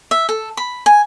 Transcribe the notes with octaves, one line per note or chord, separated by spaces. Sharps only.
E5
A4
B5
G#5